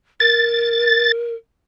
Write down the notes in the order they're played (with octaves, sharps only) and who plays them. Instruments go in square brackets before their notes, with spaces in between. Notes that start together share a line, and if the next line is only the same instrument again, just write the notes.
[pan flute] A#4 [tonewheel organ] A6